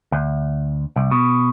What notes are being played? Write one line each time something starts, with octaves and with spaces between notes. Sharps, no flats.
D2
C2
B2